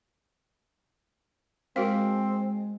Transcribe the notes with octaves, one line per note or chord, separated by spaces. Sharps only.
G#3 C4 F#4 A#4 F5